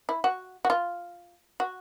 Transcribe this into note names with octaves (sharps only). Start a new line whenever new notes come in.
E4
F#4
F#4
F4
F#4